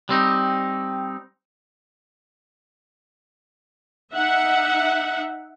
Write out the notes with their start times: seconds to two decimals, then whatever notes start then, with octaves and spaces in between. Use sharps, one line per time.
0.09 G3 C4 D#4
4.15 D#4 E5 F#5